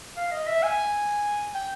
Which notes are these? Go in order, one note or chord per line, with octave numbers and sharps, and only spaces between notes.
F5
D#5
E5
G#5
G5